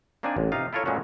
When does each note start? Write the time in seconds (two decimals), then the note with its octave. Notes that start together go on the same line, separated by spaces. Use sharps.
0.23 A#3 C4 D4 D#4 D5 G#5
0.37 A1
0.52 C3 D#4 F4 F5
0.73 E4 F4 A4 A#4 C#5
0.86 A#2 G#3 A3 B3 C#4 F#4